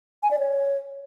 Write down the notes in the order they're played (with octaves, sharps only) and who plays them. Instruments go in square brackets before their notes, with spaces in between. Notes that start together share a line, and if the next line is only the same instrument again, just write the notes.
[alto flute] G#5
D5
C#5